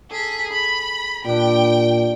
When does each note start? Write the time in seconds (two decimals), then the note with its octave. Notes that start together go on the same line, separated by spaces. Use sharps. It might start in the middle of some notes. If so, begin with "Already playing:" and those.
0.11 G#4 A4 B6
0.51 G#4 B5
1.25 A#2 G3 D4 G5